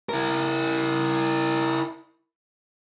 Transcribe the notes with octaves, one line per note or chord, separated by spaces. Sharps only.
E4 A#4